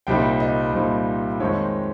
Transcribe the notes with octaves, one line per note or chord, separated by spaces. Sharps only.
C2 A#2 G3 C4 D#4 G5
D#5
C2 A#2 G3 C4 D#4
F2 D#3 G#3 C4 D#4 C#5